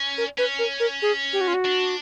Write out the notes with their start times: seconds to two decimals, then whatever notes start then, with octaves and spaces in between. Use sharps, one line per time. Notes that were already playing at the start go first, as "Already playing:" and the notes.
Already playing: C#4
0.18 A#4
0.38 C#4 B4
0.59 A#4
0.80 A#4
1.02 G#4
1.33 G4
1.41 F#4
1.48 F4
1.54 F#4
1.65 D4